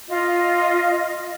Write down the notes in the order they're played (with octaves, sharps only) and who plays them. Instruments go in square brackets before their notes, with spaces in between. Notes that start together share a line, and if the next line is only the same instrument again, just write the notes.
[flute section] F4 D#5